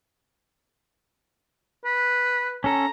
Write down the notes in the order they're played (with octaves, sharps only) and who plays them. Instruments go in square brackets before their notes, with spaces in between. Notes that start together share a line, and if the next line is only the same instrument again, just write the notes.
[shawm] B4
[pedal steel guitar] C#4 A4 [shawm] A#5